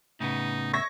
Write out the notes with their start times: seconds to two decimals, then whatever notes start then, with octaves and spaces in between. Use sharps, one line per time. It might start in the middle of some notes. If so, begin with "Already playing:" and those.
0.20 A2 C#3 B3 D#4
0.73 E5 C#6 G#6 A#6